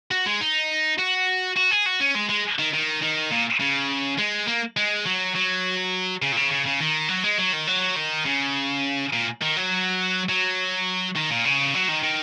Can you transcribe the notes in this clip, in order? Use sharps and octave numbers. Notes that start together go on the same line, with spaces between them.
F#4
G#3
D#4
F#4
F#4
G#4
F#4
C#4
G#3
G#3
D#3
D#3
D#3
A#2
C#3
G#3
A#3
G#3
F#3
F#3
C#3
A#2
C#3
C#3
C#3
D#3
F#3
G#3
F#3
D#3
F#3
D#3
C#3
A#2
D#3
F#3
F#3
D#3
A#2
C#3
F#3
D#3
D#3